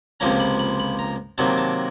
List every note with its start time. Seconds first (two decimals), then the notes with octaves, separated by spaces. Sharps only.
0.20 C#2 C3 F3 A#3 C#4 A#5
0.40 B5
0.59 B5
0.79 B5
0.99 A#5
1.38 C3 D#3 F#3 A#3 A5
1.58 A5